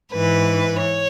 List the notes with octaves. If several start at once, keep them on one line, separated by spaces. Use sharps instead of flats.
G#2 E3 B4
C#5